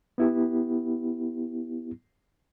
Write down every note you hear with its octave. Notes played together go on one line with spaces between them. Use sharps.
B3 E4 G4